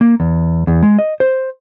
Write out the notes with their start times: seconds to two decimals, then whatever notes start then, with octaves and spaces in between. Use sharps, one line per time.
0.01 A#3
0.20 E2
0.67 E2
0.83 G#3
0.99 D#5
1.20 C5